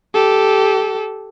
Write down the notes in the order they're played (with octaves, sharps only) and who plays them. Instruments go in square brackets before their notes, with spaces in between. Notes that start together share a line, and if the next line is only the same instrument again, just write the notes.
[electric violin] G4 A4